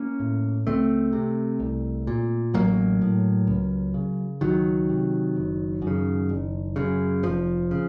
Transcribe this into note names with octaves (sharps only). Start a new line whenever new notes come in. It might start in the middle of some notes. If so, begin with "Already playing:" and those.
Already playing: A#3 C#4
A2
C#2 A3 C4
C3
C2
A#2
A1 F#3 A#3
A2
C#2
C#3
C#2 D#3 F#3
C3
F#1
F#2
C#3
F#1
F#2 C#3
F1 F3
C#3